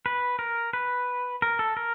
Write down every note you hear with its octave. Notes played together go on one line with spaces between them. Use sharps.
B4
A#4
B4
A#4
A4
A#4